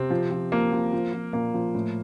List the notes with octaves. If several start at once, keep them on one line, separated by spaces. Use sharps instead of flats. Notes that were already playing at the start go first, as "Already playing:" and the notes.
Already playing: C3 C4
F3
F3
F3 A#3
F3
F3
F3
A#2 A#3
F3
A2